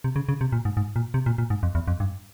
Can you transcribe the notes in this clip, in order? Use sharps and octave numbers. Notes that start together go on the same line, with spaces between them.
C3
C#3
C#3
C3
A#2
G#2
G#2
A#2
C3
A#2
A#2
G#2
F2
E2
F2
G2